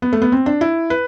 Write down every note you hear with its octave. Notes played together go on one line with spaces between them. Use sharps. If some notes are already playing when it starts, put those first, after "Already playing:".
B3
A3
B3
C4
D4
E4
B4